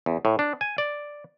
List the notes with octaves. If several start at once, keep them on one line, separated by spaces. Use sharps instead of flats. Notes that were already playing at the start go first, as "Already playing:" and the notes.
E2
A2
D4
G#5
D5